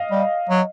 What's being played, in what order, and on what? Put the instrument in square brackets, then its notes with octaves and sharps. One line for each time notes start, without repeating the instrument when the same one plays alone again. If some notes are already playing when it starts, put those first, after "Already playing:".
Already playing: [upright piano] D#5 F5
[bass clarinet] G3
F#3